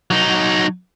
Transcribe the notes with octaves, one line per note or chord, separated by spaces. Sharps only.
F#3 D#4